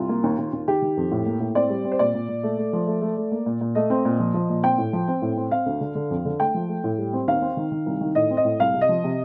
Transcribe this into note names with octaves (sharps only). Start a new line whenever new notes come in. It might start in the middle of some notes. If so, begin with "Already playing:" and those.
Already playing: C2 F4
A#3
D#2
D#2
D#2
D#3 G4
D#3
F2
A2
A#3
A2
C4 D5
G3
C4
C5
A#2 D5
A#2
A#2
A3
A3
F3
A3
A3
A3
A#3
A#2
A#2
A3 D#5
C4
A#2
F3
F3
A#2
C4 G5
A2
F3
C4
A2
C4
C4 F5
D2
D3
D3
F2
D3
A3 G5
F3
A3
A2
G3
C4
D#2 F5
C4
D#3
D#3
C2
D#3
A2 D#5
C4
D#5
A2
C2 F5
C3
D#5
F3
C3